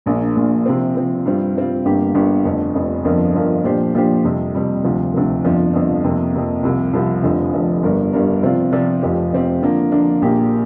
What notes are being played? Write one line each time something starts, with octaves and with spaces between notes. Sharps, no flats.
A#1 A#2 A#3 D4
A#1 A#2 A#3 D4
C3 F3 C4
C3 F3 C4
G2 G3 C4 F4
G2 G3 C4 F4
G1 G2 D3 A#3 G4
G1 G2 D3 A#3 G4
F1 F2 D3
F1 F2 D3
G1 F2 F3 D4 A#4
G1 F2 F3 D4 A#4
A#2 F3 D4 G4 C5
A#2 F3 D4 G4 C5
F2 C3 G3
F2 C3 G3
D2 C3 F3
D2 C3 F3
G1 F2 F3 D4
G1 F2 F3 D4
F2 C3 A#3
F2 C3 A#3
C2 C3 F3
C2 C3 F3
F1 F2 D3 F3
F1 F2 D3 F3
G1 G2 G3 D4 A#4
G1 G2 G3 D4 A#4
C3 F3 C4 F4 D5
C3 F3 C4 F4 D5
F1 F2 F3 C4 G4
F1 F2 F3 C4 G4
D3 F3 A#3 D4
D3 F3 A#3 D4
A#1 A#2 A#3 G4